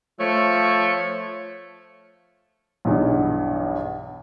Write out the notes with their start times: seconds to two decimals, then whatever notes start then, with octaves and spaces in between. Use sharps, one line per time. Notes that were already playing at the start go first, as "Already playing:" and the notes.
0.20 F3 A3 C#5
2.85 B1 E2 G2